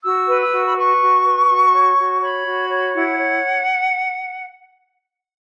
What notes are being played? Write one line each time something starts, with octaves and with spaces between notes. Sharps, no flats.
F#4 E6
B4
E6
F#4
B5
B4 C#6
F#4
B4
F#4
C#5
F#4
C#5 B5
F#4
C#5
E4 F#5
C#5